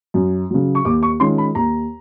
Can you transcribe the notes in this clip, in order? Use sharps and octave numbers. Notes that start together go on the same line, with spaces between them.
F#2
C#3 F#3
C#6
D#2 D6
C#6
D#3 G#3 C#4 F4 C6
B5
D#2 A#5